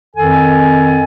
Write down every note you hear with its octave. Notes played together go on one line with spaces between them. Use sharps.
F2 D#3 A4 G#5